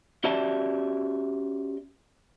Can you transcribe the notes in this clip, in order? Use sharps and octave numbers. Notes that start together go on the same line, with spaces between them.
C#4 F#4 G4 D5 E5 A5